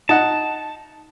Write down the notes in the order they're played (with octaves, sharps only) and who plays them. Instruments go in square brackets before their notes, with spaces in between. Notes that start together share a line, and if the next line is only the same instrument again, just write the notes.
[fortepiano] D#4 D#5 F#5 [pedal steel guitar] A5